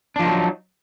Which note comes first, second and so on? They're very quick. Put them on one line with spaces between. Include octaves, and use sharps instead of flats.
D4 F3 D#4 F#3